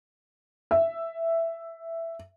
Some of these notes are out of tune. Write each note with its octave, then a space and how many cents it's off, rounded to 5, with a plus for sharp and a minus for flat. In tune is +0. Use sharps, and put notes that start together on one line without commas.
E5 +5